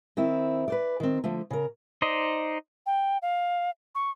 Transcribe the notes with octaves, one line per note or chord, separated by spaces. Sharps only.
D#3 C4 E4
B4 C5 D5
D#3 C4
D3 F3 A3
C#3 A#4
D#4 C5 D5 D#5
G5
F5
C#6